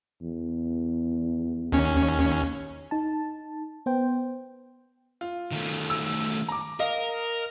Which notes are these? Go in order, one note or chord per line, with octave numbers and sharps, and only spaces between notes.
E2
D#2 C#4
D#4 A5
B3 C5 G5
F4
D#3 A3
E6
A#5 D6
A#4 D#5 F5